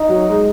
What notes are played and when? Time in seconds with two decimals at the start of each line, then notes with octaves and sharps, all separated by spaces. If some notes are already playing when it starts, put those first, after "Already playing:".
Already playing: D#4
0.09 F#3
0.30 G#3